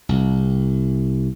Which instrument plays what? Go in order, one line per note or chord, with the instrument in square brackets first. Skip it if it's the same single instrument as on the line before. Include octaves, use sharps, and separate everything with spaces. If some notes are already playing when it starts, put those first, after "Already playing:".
[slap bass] C2